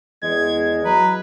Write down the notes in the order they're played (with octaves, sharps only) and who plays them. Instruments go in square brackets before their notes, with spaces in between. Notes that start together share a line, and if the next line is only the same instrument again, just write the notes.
[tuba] E2 [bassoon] G#3 [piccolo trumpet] G#6
[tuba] F#3 [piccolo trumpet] B4 [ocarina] A#5